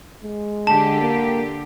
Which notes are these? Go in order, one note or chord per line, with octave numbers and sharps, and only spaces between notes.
G#3
D3 G4 A5
A#3